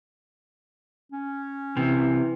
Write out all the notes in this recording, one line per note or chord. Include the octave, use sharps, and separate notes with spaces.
C#4
C3 E3